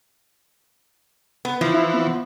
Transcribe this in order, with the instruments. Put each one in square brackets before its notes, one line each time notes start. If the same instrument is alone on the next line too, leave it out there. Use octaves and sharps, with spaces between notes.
[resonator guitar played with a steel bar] B3
[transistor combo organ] E3 [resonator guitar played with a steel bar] F3
[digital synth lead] E4
B3